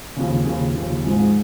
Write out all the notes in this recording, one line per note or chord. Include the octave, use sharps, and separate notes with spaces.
D#2 C#3 F3
D#2 C#3 F3
D#2 C#3 F3
G#2 F3 G#3